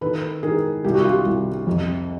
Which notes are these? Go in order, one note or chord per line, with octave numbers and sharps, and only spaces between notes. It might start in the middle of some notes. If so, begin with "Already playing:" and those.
D#3 A4 B4
D#3 G#4 A#4
C2 G4
F#4
F4 G4
C2
F2